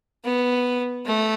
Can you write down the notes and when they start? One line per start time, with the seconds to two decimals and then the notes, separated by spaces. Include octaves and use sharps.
0.24 B3
1.06 A3